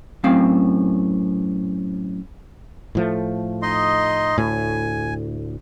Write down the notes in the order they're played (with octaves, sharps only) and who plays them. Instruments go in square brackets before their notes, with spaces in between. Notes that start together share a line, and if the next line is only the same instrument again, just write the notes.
[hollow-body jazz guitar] F#2 A2 C4 F5
[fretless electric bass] A2 F3 A3
[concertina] D#4 D#5 C6
[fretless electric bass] D2 A2 [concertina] G#5